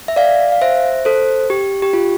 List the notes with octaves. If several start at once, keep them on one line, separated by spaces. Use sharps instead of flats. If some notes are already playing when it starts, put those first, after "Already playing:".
E5
D5 F5
F5
C5 E5
A4 C5
G4
G4
F4